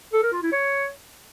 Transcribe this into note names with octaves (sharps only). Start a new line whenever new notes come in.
A4
A#4
F4
E4
C#5